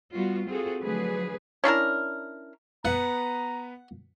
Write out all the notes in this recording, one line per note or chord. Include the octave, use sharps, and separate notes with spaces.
G3 B3 F4 F#4
C4 F4 F#4 G#4 A4
D3 F3 F#3 A3 G#4 B4
C#4 D4 E4 A#4
B3 B4 F#5 A#5